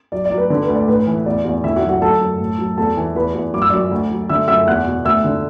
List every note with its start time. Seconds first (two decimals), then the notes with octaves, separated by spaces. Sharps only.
0.12 F#3 D5
0.25 D5
0.31 F#3
0.38 B4
0.50 D3
0.63 B4
0.69 D2
0.75 D5
0.88 A2 B4
1.07 E3
1.26 E2 D5
1.45 E2
1.64 D3 E4 E5
1.76 F#4 F#5
1.83 F#3
1.89 F#4 F#5
2.02 F#3 A4 A5
2.21 F#2
2.40 A2
2.58 F#3
2.78 E2 A4 A5
2.97 E3
3.16 E2 B4 B5
3.35 E2
3.53 F#2 D6
3.62 E6
3.70 F#2 D5 D6
3.91 D2
4.11 F#3
4.29 D3 E5 E6
4.48 F#2 E5 E6
4.67 E2 F#5 F#6
4.86 B2
5.05 D2 E5 E6
5.24 D3